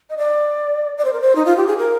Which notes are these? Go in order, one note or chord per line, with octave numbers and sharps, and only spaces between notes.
D#5
D5
D5
C5
A#4
C5
D#4
F4
G4
G#4
A#4